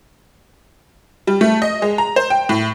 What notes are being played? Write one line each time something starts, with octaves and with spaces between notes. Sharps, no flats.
G3
A3
D#5
G#3
A#5
C5
G5
A2